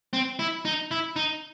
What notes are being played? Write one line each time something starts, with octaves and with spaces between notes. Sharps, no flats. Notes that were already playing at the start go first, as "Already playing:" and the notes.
C4
E4
D#4
E4
D#4